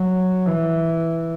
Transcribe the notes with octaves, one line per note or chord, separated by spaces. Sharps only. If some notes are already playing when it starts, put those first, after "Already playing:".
Already playing: F#3
E3